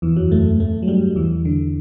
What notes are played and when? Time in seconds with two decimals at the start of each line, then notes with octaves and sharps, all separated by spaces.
0.02 E2 E3
0.16 F#2 F#3
0.31 A2 A3
0.60 A2 A3
0.82 F#3
0.88 G2 G3
1.16 E2 E3
1.45 D3